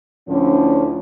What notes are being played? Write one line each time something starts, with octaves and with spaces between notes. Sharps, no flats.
D2 A2 D3 F3 C#4